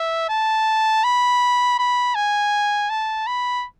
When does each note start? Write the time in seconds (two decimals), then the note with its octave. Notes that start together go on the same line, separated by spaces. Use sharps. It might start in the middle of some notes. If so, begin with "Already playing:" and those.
Already playing: E5
0.30 A5
1.04 B5
1.79 B5
2.15 G#5
2.90 A5
3.27 B5